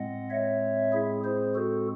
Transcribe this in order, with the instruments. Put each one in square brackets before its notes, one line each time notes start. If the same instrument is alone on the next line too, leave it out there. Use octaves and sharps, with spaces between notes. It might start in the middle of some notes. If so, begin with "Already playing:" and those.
Already playing: [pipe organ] A2 G#3 C4 D#5 F#5
C#5 E5
E4 G#4
G#4 C5
F#4 A4